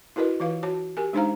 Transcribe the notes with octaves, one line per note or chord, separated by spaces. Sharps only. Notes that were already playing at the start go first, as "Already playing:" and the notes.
E4 F#4 A#4 B4 D#5
E3 F4 B4 F5
F#4 C#5 A5
G4 A#4 G#5
G#3 D4 D#4 C5 F5 A#5